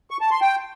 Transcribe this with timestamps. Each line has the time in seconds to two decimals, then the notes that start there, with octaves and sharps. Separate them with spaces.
0.11 C#6
0.21 A5
0.31 C6
0.41 G5